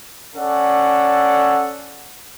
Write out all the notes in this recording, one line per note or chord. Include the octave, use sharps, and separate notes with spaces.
C#4 A4 D5 F#5